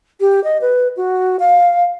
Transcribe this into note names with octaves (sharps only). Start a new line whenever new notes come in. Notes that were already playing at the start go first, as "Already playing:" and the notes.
G4
D#5
B4
F#4
F5